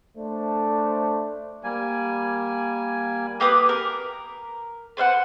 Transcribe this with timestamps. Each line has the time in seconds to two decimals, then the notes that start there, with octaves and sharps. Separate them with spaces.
0.17 A3 D4 C5
1.64 G3 A#3 G#5
3.40 A#3 G4 B4 D#6
3.69 A#4
4.97 B4 C5 F5 F#5